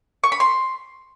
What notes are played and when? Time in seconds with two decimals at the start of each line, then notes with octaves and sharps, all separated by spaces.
0.24 C#6
0.32 B5
0.40 C6